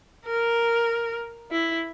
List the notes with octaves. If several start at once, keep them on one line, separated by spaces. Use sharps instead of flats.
A#4
E4